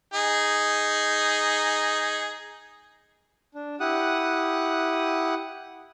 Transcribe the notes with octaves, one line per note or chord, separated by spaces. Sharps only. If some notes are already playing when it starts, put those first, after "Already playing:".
D#4 G#4
D4
E4 G4 F#5 D#6 F#6